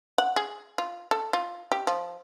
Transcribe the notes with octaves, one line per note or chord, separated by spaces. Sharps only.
F#5
G#4
F4
A4
F4
G4
F3